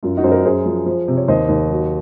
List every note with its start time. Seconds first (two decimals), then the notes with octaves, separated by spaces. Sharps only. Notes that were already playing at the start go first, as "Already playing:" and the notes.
0.03 F#2 F4
0.17 D#4 F#4
0.24 F#2 C5
0.31 F#4 A#4
0.45 F#2 G#4 C5
0.66 F3
0.86 F3
1.08 C3
1.17 C#5
1.28 D#2 C5 D#5
1.49 D#2
1.70 F#3